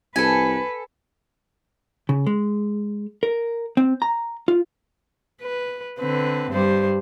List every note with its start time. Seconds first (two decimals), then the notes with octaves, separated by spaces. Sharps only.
0.16 C2 A4 B4 G#5
2.09 C#3
2.27 G#3
3.23 A#4
3.77 C4
4.02 A#5
4.48 F4
5.42 B4
5.99 D3 C4 B4
6.51 G2 G3 C5